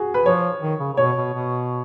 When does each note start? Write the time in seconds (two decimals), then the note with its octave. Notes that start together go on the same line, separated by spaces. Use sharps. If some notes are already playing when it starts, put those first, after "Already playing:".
Already playing: F#4 G#4
0.14 B4
0.25 F3 C#5
0.62 D#3
0.80 C#3
0.93 C#3
0.97 B2 C#5
1.16 B2
1.34 B2